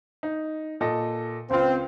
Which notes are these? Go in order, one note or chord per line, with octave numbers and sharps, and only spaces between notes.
D#4
A#2 A4 D#5
C#2 C4 F4